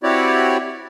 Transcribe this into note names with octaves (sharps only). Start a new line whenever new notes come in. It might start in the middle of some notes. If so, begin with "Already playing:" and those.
C4 E4 F#4 G4 C#5 D5